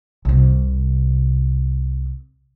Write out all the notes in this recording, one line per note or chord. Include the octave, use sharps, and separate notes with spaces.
C2 C3